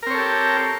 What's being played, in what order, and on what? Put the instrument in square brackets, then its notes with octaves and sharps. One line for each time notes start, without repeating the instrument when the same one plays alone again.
[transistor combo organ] A#4
C4
C#5
A4
G4